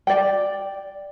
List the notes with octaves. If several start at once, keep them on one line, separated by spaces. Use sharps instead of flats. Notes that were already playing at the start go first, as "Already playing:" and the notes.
D5 G5